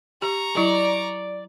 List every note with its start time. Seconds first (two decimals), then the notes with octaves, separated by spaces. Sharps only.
0.22 G4 A#5 C#6
0.57 F#3 E4 D5